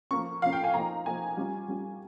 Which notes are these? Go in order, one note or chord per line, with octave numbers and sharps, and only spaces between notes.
F3 A#3 C#4 C#6
F3 A#3 C#4 F5
G5
G#5
F3 A#3 D#4 A#5
F3 A#3 D#4 G#5
G3 C#4 F4
G3 C#4 F4